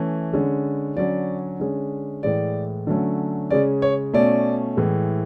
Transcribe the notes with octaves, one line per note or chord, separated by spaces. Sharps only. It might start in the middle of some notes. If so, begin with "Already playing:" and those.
Already playing: E3 A3 C#4
D3 G#3 C#4
D3 F#3 C#4 D5
D3 G#3 C#4
A2 E3 G#3 D5
D3 F#3 A3 C#4
C#3 G#3 C#4 D5
C#5
B2 A3 C#4 D5
A2 E3 G#3